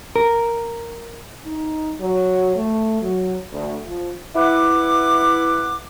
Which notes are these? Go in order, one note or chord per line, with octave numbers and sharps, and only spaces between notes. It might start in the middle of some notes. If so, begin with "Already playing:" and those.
A#4
D#4
F#3
A3
F#3
D2
F3
E4 B4 F#5 D6